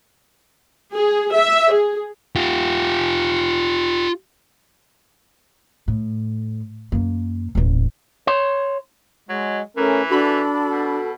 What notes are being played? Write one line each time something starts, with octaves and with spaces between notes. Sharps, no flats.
G#4
E5
G#4
F4 G4
A2
F#2 A#3
D#1 A1
C#5 C6
F#3 G#3
E3 A3 C#4 A#4
D4 F#4 A4 B5
B2